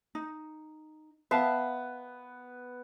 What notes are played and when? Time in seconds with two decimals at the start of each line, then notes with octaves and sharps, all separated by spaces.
0.15 D#4
1.31 B3 E5 F5 A5